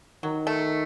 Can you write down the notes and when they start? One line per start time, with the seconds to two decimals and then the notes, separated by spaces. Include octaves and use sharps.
0.23 D#3 F#3
0.47 A3